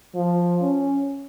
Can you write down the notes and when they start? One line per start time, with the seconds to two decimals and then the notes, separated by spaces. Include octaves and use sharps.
0.15 F3
0.61 C#4